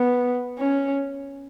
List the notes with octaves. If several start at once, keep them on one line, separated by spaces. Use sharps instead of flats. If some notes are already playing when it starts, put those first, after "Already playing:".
Already playing: B3
C#4